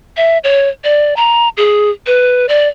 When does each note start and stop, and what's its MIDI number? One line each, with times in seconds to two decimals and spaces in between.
0.17 0.38 76
0.44 0.69 73
0.84 1.14 74
1.17 1.49 82
1.57 1.90 68
2.07 2.46 71
2.49 2.68 74